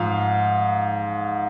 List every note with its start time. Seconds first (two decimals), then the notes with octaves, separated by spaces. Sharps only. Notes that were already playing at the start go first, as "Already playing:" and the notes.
Already playing: G#2 F3 F5